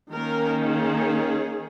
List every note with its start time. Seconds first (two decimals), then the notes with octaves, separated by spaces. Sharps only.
0.12 D#3 A#3 C#4 A#4
0.64 G#4